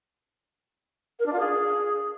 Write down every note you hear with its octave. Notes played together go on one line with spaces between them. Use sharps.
A#4
D4
F4
G#4